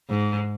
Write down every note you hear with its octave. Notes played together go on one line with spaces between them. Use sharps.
G#2